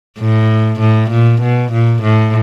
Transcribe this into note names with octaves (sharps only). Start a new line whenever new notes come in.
A2
A2
A#2
B2
A#2
A2